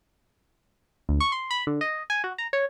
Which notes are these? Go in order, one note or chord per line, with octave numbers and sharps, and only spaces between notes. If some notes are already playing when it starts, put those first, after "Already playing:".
D2
C#6
C6
B5
D3
D#5
G#5
F#4
A#5
C#5